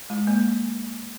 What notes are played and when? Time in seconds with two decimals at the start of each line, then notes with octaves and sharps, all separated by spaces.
0.10 G#3
0.27 A#3